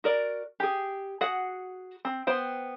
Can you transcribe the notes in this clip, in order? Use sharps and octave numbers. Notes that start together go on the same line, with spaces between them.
F#4 A#4 D5
G4 G#4
F#4 G#4 F#5
C4
B3 C5 G5